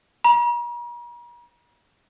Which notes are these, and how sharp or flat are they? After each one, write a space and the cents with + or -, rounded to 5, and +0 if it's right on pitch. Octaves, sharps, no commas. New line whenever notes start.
A#5 +45